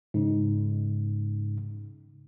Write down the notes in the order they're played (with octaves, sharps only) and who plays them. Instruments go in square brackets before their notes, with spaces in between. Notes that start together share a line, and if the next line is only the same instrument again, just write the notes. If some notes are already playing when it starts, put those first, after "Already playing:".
[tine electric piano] G#2 C#3